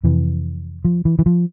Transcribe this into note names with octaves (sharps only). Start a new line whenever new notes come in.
F2 C3 E3
F3
E3
E3
F3